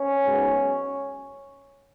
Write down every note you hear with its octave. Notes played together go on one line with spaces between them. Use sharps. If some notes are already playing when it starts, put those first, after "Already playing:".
Already playing: C#4
G#2 F#3 B3